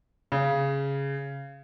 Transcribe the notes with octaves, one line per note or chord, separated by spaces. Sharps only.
C#3